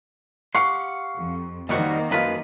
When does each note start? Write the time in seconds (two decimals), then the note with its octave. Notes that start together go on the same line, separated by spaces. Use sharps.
0.55 G4 F5 F#5 C6 C#6
1.17 F2
1.69 D#2 D#3 G3 A#3 D#4 F#4 C5 F#5
2.11 F#2 F3 G#3 F4 B4